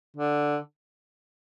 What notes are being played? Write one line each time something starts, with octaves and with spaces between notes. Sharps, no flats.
D3